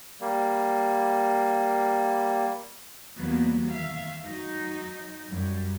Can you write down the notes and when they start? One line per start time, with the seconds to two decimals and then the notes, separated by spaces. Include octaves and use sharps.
0.21 G3 A#3
3.17 E2 F#3 G3 A#3 B3
3.71 D#3 E5 F5
4.24 F#3 D#4
5.31 F#2 G3